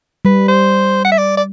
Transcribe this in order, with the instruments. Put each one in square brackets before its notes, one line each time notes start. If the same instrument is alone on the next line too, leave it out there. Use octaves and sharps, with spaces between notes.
[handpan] G3 [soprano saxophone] B4
[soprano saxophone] C5
F#5
E5
D5
D5